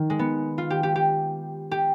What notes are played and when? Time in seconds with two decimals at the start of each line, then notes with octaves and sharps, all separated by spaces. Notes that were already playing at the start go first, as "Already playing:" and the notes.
Already playing: D#3
0.10 G#3
0.19 B3
0.58 F4
0.70 G4
0.83 G4
0.96 G4
1.71 G4